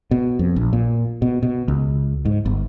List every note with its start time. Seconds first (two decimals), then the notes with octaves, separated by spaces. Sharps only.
0.11 B2
0.39 F2
0.56 A#1
0.73 A#2
1.22 B2
1.43 B2
1.68 C#2
2.25 G#2
2.46 G1